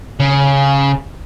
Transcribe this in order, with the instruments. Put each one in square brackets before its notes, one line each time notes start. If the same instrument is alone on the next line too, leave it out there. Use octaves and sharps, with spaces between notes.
[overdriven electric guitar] C#3